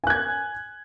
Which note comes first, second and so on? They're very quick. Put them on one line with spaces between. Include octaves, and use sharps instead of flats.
G#5 F#6 G#6